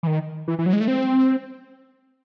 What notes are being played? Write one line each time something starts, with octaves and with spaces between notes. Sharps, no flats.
E3
D#3
E3
E3
F#3
G#3
A3
C4